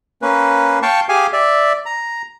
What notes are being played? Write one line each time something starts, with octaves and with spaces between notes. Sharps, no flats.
A#3 C#4 B4
F5 G5 A5 C#6
G4 G#4 F5 G#5
D5 E5
A#5